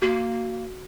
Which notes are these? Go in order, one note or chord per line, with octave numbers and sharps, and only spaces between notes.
A#3 F#4